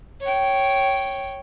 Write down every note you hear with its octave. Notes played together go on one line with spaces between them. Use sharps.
C#5 G5